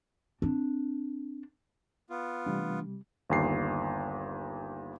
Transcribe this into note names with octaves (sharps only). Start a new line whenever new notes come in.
C4 D4
B3 F4
C3 E3 G3 A3 D4
G1 D#2 C7